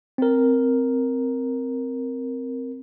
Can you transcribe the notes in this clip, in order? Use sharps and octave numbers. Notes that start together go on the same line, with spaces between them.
C4 A#4